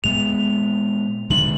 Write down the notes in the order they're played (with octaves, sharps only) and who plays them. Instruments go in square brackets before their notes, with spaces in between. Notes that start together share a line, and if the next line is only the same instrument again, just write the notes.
[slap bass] A#2 G#3 B3 [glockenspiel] F7
[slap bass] D3 G#3 D4 [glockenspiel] F#7